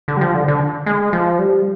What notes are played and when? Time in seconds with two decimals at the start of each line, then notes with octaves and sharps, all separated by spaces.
0.08 D3
0.17 G3
0.21 F3
0.34 D3
0.48 D3
0.86 G#3
1.13 F3
1.39 G3